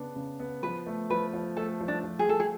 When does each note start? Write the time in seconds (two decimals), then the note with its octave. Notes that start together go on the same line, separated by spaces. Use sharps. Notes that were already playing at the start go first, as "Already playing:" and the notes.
Already playing: C#3 B3 D4
0.16 C#3
0.39 B3
0.63 F3 B4
0.86 A3
1.10 F3 B4
1.33 F3
1.57 A3 A4
1.80 F3
1.88 D4
2.04 F3
2.19 G#4
2.28 F3 A4
2.40 G#4